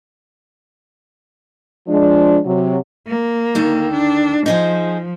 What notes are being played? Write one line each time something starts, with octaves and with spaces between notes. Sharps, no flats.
F3 G#3 D4
C3 F#3
A#3
D2 D#3 A4
D4
F3 D#4 G#4 C5